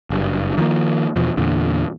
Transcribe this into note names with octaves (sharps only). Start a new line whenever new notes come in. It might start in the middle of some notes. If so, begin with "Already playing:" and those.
F#1 G2
D#3 F3 G#3 A#3
E2 B2 F3
E2 A#2 D3